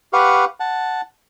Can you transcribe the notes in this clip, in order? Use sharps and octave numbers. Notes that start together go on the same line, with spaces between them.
G4 B4 F5 F#5 C#6
F#5 A5